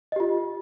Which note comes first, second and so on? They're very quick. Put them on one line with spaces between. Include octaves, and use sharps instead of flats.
D#5 G4 F4